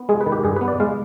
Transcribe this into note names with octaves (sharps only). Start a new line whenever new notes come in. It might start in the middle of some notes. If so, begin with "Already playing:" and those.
Already playing: B3
G#3 G#4
B4
D#3
G4
G2 G#4
B4
B3
D5
G#3 F5